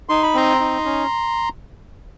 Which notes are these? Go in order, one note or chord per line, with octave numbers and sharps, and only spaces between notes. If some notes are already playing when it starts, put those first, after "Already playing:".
D#4 C6
B5
C4 A#5 C6
D#4
C#4